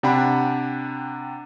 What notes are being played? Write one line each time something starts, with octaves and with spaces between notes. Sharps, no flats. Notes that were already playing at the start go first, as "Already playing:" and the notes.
C3 D4 F#5 G5 B5